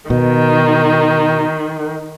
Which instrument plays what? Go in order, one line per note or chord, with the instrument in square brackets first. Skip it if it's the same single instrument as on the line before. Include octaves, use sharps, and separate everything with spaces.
[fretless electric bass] B2 [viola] D#3